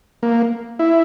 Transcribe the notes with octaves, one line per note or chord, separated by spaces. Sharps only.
A#3
E4